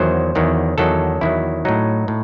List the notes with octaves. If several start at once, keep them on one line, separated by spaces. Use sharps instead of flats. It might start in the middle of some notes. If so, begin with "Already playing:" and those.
Already playing: E2 D#3 F#3 C5
E2 D#3 F#3
E2 D#3 F#3 A4
E2 D#3 F#3 E4
A2 F#3 D#4
A2